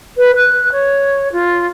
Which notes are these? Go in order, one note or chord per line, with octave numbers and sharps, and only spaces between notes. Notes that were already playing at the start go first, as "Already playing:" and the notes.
B4
F#6
C#5
F4